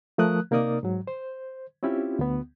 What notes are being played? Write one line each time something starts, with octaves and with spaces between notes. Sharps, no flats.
F3 A3 A#4 D#6 F#6
C3 A#3 D#4 A#4 D5 D#6
G#2 F#3
C5
C4 C#4 E4 F4 G4
D2 B3